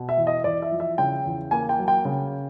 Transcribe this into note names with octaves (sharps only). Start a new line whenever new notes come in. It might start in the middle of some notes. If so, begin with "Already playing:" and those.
Already playing: B2
E5
E2
D#5
E2 D5
E5
F3
E5
C#3 G5
E2
A#3 G#5
G5
F#3
G5
C#3